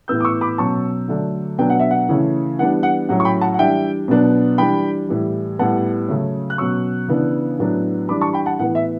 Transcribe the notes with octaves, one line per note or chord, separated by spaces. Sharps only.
A2 E3 B3 E6 G6
D6
C#6 E6
B5 D6
B2 F#3 C#4 A5 C#6
D3 F#3 A3 D4
B2 F#3 B3 D4 G5
F#5
E5
F#5
C#3 E3 A3 C#4
E3 G3 B3 D4 F#5
F#5
A2 F#3 C#4 F#5
C#6
G5 B5
F#5 A5
F#5
E3 G3 D4 E5 G5
B2 F#3 B3 D4
E3 G3 D4 G5 B5
A2 E3 G3
A2 G3 B3 F#5 A5
C#3 F#3 A3 C#4
F#6
B2 F#3 C#4 C#6 E6
C#3 E3 B3 D4
A2 F#3 B3 D4
E3 G3 D4 B5 D6
A5 C#6
G5 B5
F#5 A5
A2 E3 B3 F#5
E5